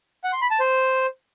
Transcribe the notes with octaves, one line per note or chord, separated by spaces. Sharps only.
F#5
C6
B5
A5
C5